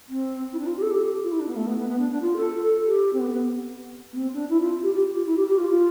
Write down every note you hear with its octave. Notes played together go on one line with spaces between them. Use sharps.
C4
E4
D4
F4
G4
A4
G4
F4
E4
D4
B3
A3
B3
B3
B3
D4
D4
F4
A4
G4
C4
B3
B3
B3
C4
D4
E4
F4
G4
G4
F4
E4
G4
G4
F4
F4